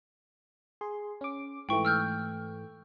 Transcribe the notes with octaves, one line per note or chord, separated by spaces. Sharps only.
G#4 C6
C#4 D6
G#2 E3 A3 G5 C#6
E6 F6 G6